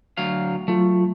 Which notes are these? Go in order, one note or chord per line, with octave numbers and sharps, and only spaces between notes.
D2 F#3 F5
F#3 A3 F4